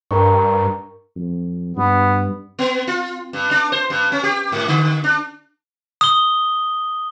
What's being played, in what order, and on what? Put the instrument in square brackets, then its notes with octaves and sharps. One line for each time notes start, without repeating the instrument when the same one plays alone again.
[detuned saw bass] G2 [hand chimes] A#4 A#5 C#6
[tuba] F2
[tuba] G2 [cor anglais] B3
[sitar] B3
F4
G2
D4
C5
G2
C#4
G4
G#2
D3
D4
[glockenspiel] D#6 G7